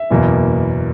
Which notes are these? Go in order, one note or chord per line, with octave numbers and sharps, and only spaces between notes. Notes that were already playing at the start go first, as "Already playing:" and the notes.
Already playing: E5
F#1 E2 B2 A#3